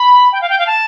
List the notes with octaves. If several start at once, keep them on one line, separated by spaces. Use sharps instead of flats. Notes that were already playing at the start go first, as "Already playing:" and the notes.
Already playing: B5
G5
F5
G5
F5
A5